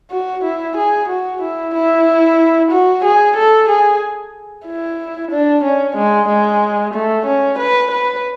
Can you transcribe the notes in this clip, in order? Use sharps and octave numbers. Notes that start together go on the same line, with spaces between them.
F#4
E4
G#4
F#4
E4
E4
F#4
G#4
A4
G#4
E4
D4
C#4
G#3
G#3
A3
C#4
B4
B4